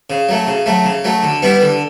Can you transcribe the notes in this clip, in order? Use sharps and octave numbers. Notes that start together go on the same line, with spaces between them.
C#3
F#3 A3
C#3
F#3 A3
C#3
F#3 A3
D3
G3 B3 E4
D3